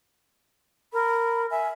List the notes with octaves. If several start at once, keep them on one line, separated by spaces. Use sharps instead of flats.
A#4 B5
E5 G#5